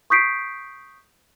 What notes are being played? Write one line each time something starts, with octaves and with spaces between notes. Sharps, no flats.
C#6 D#6 G6 B6 C7 D7